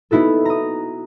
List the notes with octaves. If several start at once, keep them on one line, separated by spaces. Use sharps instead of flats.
B3 D#4 E4 F#4 A4
A#5 D#6